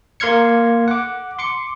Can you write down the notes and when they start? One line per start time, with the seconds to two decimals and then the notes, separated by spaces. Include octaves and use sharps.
0.20 A#3 C6 F6 G#6 C#7
0.88 F#5 D6
1.39 C6 D6 C#7